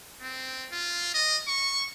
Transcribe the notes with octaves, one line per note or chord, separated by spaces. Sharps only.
C4
F4
D#5
C#6